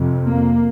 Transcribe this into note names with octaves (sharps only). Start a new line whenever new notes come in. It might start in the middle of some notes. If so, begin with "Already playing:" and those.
Already playing: F2 C3
A#3